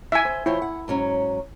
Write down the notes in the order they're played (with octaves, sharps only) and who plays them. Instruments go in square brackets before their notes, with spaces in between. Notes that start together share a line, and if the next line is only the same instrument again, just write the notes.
[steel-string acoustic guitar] E4 [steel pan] E5 G#5
[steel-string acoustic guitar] C5
[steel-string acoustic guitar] F3 C5 C#5 [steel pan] E4
[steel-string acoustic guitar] F#5
G#2 F#3 C#4